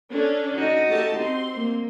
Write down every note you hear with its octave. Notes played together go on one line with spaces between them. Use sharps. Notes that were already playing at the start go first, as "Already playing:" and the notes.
C#4 D4 A4
D#4 F#4
A3 G4 A5
C4 C6
A#3